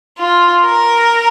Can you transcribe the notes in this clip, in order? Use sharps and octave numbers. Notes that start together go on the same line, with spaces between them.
F4
A#4